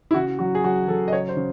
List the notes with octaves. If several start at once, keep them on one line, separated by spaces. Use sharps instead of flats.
E4
C#3 F#4
F#3 F#4
G#4
F#3 F#4
F#3 A4
D#5
C#3 C#5
C5
C#3